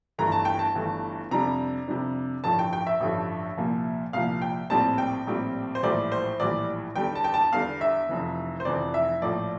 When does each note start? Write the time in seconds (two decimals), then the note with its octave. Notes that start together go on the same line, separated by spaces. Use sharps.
0.18 G1 G2 E3 A3 A#5
0.32 A5
0.45 G5
0.59 A5
0.75 G1 G2 E3 A3
1.31 F2 C3 G3 D4 A#5
1.88 F2 C3 G3 D4
2.44 A1 G2 D3 F3 A5
2.59 G5
2.73 G5
2.87 E5
3.00 A1 G2 D3 F3
3.57 C2 A#2 F3
4.13 C2 A#2 F3 F5
4.42 G5
4.70 A#1 A2 G3 C4 A5
4.98 G5
5.27 A#1 A2 G3 C4
5.75 C5
5.83 A#1 A2 E3 G3 D5
6.12 C5
6.39 A#1 A2 E3 G3 D5
6.96 E2 D3 G3 G5
7.15 A5
7.24 G5
7.34 A5
7.53 E2 D3 G3 F5
7.81 E5
8.09 F1 F2 E3
8.60 C5
8.65 F1 F2 E3 D5
8.94 E5
9.22 A#1 A2 F3 D5